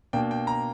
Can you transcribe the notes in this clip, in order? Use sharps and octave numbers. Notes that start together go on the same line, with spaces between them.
B2 A#3 D4 G5
G5
A#5